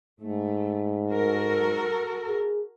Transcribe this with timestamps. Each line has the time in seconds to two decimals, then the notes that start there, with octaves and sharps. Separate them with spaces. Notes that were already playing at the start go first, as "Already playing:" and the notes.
0.20 G#2 A3
1.09 F#4 A4 A#4
2.28 G#4